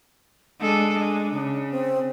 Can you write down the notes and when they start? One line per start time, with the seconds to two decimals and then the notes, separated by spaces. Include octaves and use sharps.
0.61 G#3 D4 A4
0.98 G#3
1.34 C#3
1.71 C4